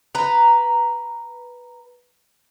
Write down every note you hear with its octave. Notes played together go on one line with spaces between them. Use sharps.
B4 A#5